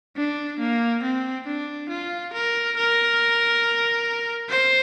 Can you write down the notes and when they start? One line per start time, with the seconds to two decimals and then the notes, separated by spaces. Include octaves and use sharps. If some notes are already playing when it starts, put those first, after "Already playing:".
0.17 D4
0.60 A#3
1.02 C4
1.47 D4
1.89 F4
2.33 A#4
2.77 A#4
4.50 C5